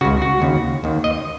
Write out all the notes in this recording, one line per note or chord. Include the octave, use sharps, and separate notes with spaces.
C#2 C#3 F#4
F#4
D#2 C#3
D#2 D#3
D#5